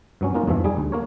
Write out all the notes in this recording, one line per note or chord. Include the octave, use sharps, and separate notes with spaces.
G2 F#3 C#4
A#3 C#4 D#4 F4 A#4
E2 G2 B2 E3 F3 E5
G3 D#4 G#4
D2
A#3 A#4 C#5